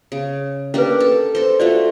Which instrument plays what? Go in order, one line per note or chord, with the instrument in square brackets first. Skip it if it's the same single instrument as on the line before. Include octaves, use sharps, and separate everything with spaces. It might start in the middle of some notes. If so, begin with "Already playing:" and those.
[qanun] C#3
[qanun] A#3 D4 G4 [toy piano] C#4 B4
[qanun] A4
A4 C5
[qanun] A3 F4 F#4 [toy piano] D5